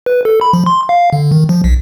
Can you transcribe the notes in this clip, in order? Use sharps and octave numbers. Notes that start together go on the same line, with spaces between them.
B4
A4
B5
F3
C6
F5
D3
D#3
F3
B1